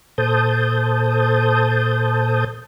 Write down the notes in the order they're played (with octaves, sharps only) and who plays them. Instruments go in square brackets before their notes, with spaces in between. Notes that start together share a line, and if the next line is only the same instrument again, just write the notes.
[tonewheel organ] A#2 A4 C5 A5 D#6 G6